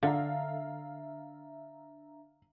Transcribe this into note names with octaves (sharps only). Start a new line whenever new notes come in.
D3 D4 E5 F5 A#5